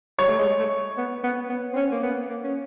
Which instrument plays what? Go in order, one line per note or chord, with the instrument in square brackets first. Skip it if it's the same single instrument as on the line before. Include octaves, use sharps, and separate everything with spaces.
[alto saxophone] G3 [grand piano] C#5
[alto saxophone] A3
G#3
A3
B3
B3
B3
C4
C#4
A#3
B3
A#3
C#4